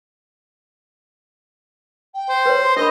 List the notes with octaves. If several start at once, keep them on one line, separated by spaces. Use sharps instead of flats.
G5
C5
B4 C#5
C6
D4 A#4 D#5 B5